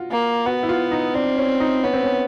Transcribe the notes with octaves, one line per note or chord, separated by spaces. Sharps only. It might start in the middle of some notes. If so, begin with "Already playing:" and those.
Already playing: F4 F#4
A#3
B3 F#4
E4
F4
D#4
C4 D4
C#4
D#4
B3 C#4
C4
C#4